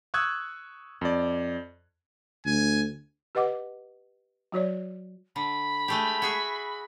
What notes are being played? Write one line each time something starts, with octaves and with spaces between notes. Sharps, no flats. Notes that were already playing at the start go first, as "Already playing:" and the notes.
C#6 D#6 E6 F#6 G#6
F2 D5
D2 G#5
G4 B4 D#5 F#5 D6
F#3 F#4 C#5 D5
D3 B5
G#3 A3 G4
F#4 G#4 E5